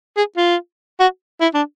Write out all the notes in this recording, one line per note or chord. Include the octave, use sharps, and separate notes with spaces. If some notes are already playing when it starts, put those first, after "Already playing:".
G#4
F4
F#4
E4
D4